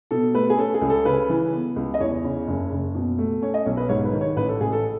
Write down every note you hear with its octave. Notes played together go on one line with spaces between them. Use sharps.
B2 A4
A3 B4
G#4
C#4 A4
G#4
C#2
A4
C#3 B4
E3
B3
C#2
D#5
E2 C#5
C#3
F#1
F#1
B2
A3
C#4 C#5
D#5
B1 C#5
B4
G#2 C#5
B4
D#3
C#5
A1 B4
A4
A1 G#4
A4